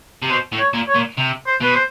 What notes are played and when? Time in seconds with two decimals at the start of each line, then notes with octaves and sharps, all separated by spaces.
0.22 C3
0.30 B2 C5
0.52 A2
0.59 C#5
0.73 A#2
0.88 C#5
0.95 A#2
1.17 C3
1.46 C5
1.61 B2 B4
1.75 C5